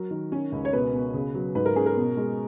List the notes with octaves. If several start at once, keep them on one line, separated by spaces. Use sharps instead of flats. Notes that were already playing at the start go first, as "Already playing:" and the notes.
Already playing: F#3 A#4
D#3
C#4
C#2
C#5
B2 B4
B2
C#3
F#3
G#2 B4
A#4
C#4 G#4
A#4
B2
G#3